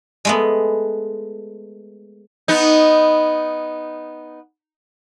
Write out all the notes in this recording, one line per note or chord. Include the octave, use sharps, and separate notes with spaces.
G#3 A3 B3
B3 D#4